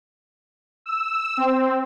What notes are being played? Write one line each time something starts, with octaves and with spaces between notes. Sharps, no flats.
E6
C4